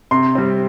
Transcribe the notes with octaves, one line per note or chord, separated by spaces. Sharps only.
C3 C6
G3 C4